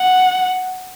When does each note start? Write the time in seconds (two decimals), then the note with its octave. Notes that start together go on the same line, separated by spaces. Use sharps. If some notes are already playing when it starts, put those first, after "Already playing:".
Already playing: F#5